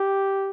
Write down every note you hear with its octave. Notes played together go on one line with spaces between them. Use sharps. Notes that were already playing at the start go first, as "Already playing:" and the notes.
Already playing: G4